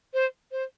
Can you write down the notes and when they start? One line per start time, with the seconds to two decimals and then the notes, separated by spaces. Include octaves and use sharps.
0.14 C5
0.52 C5